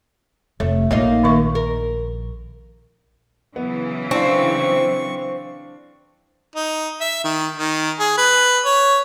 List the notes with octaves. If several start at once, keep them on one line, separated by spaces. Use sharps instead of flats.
F1 A3 C#5
A#1 A#3 D#4 F4 C#5
D#3 E5 C#6
A#4
C#3 E3 F#3 B3
C4 D4 D5 F5 C#6
D#4
E5
D#3
D#3
G#4
B4
C#5